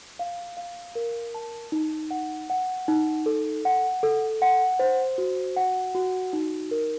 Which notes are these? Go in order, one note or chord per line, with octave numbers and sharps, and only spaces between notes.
F5
F5
A#4
A5
D#4
F#5
F#5
D#4
A4
F#5
A4
F#5
C5
F#4
F#5
F#4
D#4
A#4